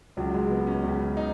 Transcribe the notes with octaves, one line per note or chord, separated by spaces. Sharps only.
C#2 C#3 F#3
G#3
B3
C#4
C#2 C#3
D#4